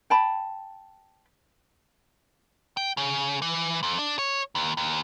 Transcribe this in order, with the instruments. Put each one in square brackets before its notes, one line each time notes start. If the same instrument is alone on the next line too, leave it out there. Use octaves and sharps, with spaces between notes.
[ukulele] G5 A5 B5
[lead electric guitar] G5
C#3
E3
F2
D4
C#5
D#2
D#2